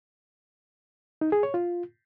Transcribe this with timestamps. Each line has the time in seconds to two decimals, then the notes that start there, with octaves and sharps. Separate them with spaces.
1.21 D#4
1.32 G#4
1.43 C#5
1.54 F4